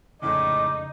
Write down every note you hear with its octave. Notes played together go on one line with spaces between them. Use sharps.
F2 A2 C#3 G#3 D#4 D5